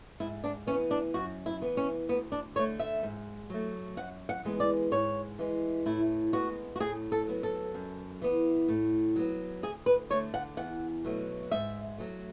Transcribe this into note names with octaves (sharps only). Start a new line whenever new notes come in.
G#2 E4
D4
E3 C#4
B3
D4
F#2 F#4
E4
E3 B3
C#4
D2 B3
D4
D3 A3 C#5
E5
G#2
F#3 A3
F#2 F#5
F#5
E3 G#3 B3
D5
G#2 C#5
E3 G#3
A2 E4
G#3 B3 F#4
F#4
A2 G#4
A4
F#3 B3
A4
F#2
E3 B3
A2
F#3 B3
D2 G#4
B4
D3 A3 C#5
F#5
E2 F#5
B2 F#3 A3
G#2 E5
F#3 A3